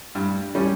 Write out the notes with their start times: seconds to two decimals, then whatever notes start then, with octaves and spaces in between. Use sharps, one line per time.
0.15 G2
0.55 G3 C#4 G4